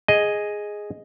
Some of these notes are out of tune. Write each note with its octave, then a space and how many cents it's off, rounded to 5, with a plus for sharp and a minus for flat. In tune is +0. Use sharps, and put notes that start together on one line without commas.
G#4 +0 D#5 +0